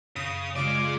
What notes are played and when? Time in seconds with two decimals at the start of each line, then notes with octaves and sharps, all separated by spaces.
0.16 F#2 C#3 D#6 A#6
0.56 C#3 G3 G#3 F4 D5 F5 D6 G#6